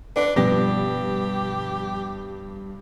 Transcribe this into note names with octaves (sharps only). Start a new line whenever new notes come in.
D4 B4
G2 B2 F3 G3 B3 G4 A#6